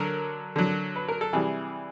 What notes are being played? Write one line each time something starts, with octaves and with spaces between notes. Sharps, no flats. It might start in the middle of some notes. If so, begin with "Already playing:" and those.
Already playing: D3 F#3 A#4
D3 F#3
B4
A#4
A4
C3 E3 G3 G#4